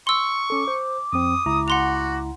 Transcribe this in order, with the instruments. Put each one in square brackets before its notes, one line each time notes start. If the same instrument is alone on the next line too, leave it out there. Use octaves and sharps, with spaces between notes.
[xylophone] C6 E6 [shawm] C#6
[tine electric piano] C#4 A4 [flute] D6
[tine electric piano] C5
[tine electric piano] F2 C4 [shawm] D#6
[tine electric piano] C#2 E4 A#5
[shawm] F#4 [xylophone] F#5 C6 F7